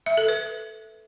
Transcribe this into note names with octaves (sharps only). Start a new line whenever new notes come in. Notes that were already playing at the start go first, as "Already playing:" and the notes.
E5
A4
B4